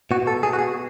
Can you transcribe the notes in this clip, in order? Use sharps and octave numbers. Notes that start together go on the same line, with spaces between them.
B2 F#4
A4
B2 G#4
F#4
G#4